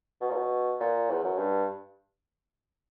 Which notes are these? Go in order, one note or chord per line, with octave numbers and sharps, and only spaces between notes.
B2
A#2
B2
A#2
E2
F#2
G2